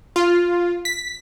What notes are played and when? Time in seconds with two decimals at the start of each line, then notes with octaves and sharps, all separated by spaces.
0.16 F4
0.85 B6